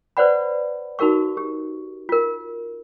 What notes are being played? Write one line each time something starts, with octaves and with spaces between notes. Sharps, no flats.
B4 C5 D5 F#5 B5
D#4 F#4 A#4 F5 C#6
G4
F4 A#4